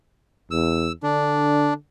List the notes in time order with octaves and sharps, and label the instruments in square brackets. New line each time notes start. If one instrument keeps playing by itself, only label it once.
[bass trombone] E2 [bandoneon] E6
[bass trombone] D3 [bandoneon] D4